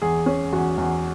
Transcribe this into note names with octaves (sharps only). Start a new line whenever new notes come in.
E2 G#4
C#4
E2 F#4
E2